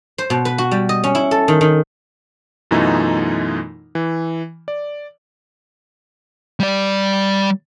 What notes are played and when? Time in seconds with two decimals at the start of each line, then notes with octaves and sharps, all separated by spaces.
0.18 C5
0.30 B2
0.45 B4
0.58 F#4
0.71 G3
0.89 D#5
1.04 C#4
1.15 E4
1.31 A4
1.48 D#3
1.61 D#3
2.71 F#2 B2 E3 A3 D#4 F4
3.95 E3
4.68 D5
6.60 G3 D5